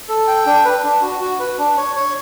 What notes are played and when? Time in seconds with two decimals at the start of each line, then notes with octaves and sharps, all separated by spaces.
0.09 A4
0.27 G5
0.46 D4
0.65 B4
0.83 D4
1.02 F#4
1.21 F#4
1.39 B4
1.58 D4
1.77 C#5
1.96 C#5